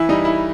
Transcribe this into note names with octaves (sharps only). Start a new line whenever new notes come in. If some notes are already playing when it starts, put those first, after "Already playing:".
Already playing: E3 E4
G3 D#4
E4